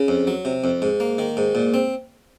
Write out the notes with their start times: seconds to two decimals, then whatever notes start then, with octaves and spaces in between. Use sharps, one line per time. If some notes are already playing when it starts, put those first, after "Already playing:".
Already playing: C#3
0.08 F2
0.27 F#3
0.45 C3
0.64 F2
0.82 G#2
1.00 A#3
1.18 D#3
1.37 G#2
1.55 A#2
1.74 C4